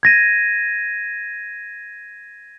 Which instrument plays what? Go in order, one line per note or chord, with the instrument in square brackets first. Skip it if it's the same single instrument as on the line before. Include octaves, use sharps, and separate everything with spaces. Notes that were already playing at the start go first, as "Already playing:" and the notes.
[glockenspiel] G#6 A#6 D#7